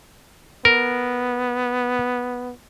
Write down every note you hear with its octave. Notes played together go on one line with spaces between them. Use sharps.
B3 A#4